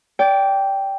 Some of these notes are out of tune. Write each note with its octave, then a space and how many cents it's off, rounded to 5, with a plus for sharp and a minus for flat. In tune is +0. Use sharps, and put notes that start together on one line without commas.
D5 -25 G5 +0